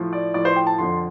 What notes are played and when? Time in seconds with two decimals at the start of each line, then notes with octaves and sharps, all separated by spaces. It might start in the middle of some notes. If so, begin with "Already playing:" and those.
Already playing: A2 F3
0.13 D5
0.34 A2 F3 D5
0.45 C5
0.56 G5
0.67 A5
0.78 F2 D3 F3 C6